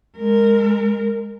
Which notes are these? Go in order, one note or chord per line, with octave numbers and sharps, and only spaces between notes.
G#3 A#4